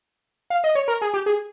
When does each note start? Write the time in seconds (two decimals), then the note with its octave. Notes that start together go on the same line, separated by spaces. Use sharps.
0.50 F5
0.64 D#5
0.75 C#5
0.88 A#4
1.02 G#4
1.14 G4
1.26 G#4